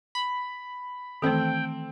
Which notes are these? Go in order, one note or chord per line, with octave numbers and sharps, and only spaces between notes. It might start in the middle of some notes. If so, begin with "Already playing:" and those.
B5
D#3 E3 A3 C4 A4 G5